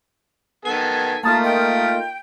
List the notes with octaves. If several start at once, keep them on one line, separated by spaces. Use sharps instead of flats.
D#3 B3 A4 G#5 B6 C7
A3 A#3 D#4 F4 A5
G5